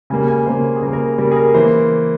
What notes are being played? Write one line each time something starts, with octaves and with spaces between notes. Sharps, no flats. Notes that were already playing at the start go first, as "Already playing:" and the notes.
C#3 G3 A#3 G#5
G#5
C#3 G3 A#3 C5
G#4
C#3 G3 A#3 A#4
A#4
G#4
C#3 G3 A#3 A#4
G#4
A#4
E3 A#3 C5